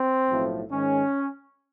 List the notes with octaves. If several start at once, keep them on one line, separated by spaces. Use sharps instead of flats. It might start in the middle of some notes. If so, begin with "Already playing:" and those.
Already playing: C4
B1 A2 F3
G#2 D#3 G#3 C#4